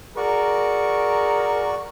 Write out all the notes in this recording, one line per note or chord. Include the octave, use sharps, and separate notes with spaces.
F#4 G#4 A#4 D5 C#6